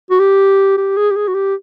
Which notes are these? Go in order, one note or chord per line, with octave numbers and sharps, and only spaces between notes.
F#4
G4
G4
G#4
G4
G#4
F#4
G4